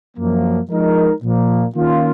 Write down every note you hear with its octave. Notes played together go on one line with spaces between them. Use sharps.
F#2 F3 A#3
F3 G#3 D#4 A#4 D#5
A#2 F3 A#3
D#3 A#3 C#4 F4